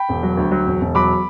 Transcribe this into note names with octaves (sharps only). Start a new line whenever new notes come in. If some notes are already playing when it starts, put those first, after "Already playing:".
Already playing: G5 B5
E1
F#3
D2
F#3
E1
E1
F#3 B5 D6